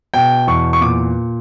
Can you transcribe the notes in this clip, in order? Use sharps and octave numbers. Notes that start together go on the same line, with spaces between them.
B2 G5
E2 C#6
C#6
A#2 D6